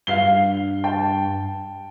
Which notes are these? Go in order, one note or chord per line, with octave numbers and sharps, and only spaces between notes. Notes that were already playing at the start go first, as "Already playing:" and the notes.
G2 F5 C7 G7
G5 A5